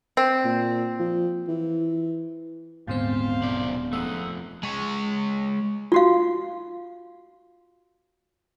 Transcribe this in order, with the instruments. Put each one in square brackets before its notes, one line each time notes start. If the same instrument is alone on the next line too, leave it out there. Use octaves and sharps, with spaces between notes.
[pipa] C4
[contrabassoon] A#2
F3
E3
[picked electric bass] D#1 B3 [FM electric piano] G#2 D3 C4 [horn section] G4 C5 F5
[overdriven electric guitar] B1 D5
[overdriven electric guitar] F2 A3 [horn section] A#3 G#4 F#5 [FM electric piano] E6
[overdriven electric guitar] G#3 C#5
[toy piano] F4 F#4 F5